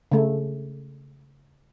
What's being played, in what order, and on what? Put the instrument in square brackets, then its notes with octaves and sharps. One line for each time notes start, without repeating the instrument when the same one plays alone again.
[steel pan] C#3 A3